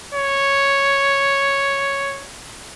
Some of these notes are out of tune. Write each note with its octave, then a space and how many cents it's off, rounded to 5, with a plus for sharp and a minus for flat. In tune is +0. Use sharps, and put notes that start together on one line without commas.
C#5 +0